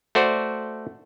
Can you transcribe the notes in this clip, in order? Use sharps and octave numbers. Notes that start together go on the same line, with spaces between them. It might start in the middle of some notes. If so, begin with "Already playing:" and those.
A3 F#4 C5 D5